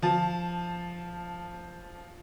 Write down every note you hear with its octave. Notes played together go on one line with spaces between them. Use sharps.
F3 A5